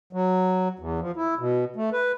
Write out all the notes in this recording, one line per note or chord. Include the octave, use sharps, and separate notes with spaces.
F#3
E2
F3
E4
B2
A3
B4